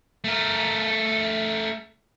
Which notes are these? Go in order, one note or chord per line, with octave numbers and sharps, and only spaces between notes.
A3 A#4